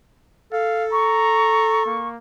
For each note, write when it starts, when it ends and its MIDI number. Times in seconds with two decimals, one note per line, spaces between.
0.52 2.02 69
0.52 0.84 77
0.92 1.82 82
0.92 2.08 85
1.86 2.17 58